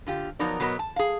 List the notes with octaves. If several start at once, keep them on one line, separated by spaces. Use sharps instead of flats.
D3 F4 G4
F3 F#3 B3 D#4 A#4 D5
B2 F#3 B3 A#4 D#5
A5
G#4 F5